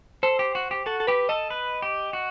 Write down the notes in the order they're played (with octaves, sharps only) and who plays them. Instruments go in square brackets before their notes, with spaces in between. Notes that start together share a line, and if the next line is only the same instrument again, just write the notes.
[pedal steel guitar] A4 [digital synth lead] C5
[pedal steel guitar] G4
F#4
G4
[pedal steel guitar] F#4 [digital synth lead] A4
[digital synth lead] A4
[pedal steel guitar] G4 [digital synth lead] B4
[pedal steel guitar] A4 [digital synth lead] D#5
[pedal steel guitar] B4
G4
F#4